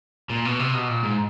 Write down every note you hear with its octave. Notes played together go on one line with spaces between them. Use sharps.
A#2
B2
C3
B2
A#2
G#2